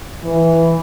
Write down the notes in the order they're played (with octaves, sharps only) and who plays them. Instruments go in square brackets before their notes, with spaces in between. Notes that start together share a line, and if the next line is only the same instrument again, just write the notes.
[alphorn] E3